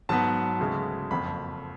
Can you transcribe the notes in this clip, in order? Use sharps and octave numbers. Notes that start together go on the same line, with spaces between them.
G#2 F#3 B3 A5
D2 C#3 G#3
F#1 F2 F3 B5